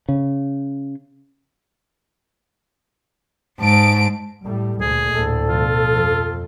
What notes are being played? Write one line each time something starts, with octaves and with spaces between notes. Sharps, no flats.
C#3
G#2 A5 D7
A2 G3
D2 A#2 G#4
D2 A2 A4
B2 F3 F4
F2